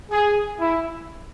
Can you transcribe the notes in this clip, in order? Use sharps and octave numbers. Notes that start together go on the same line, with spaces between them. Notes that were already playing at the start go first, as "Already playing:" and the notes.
G#4
E4